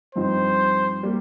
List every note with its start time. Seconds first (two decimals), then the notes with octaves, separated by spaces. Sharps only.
0.15 G2 F3 C4 D#4 C5
1.03 G3 A#3